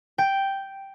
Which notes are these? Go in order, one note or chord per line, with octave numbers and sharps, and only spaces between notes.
G5